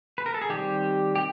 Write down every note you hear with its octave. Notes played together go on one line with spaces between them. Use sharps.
B4
A#4
A4
G#4
D#3 G3 C4 G4
G4